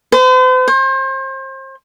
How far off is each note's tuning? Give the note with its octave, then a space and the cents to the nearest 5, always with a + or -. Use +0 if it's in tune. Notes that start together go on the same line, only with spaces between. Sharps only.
C5 -45
C5 +35